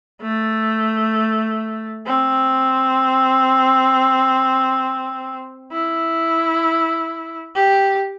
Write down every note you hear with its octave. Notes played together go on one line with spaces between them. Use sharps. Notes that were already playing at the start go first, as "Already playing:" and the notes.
A3
C4
E4
G4